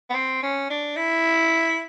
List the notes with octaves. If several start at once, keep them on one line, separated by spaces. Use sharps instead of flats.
B3
C4
C#4
D4
E4